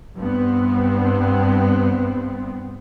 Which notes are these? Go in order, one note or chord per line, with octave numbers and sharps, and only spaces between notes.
G2 B3 C4